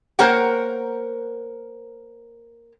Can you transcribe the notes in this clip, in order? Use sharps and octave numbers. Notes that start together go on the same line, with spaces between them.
A#3 A#4 C5 C#5 F#5 G5